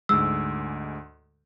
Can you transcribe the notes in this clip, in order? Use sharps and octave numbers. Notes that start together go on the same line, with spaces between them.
D2 G#2 G#3 E6